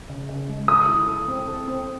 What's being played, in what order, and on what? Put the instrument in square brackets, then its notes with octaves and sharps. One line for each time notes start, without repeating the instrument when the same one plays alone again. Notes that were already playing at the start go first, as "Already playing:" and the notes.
[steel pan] C#3
C#3
G#3
[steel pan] A4 [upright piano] D#6
[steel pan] E4
A4
C4
A4
C4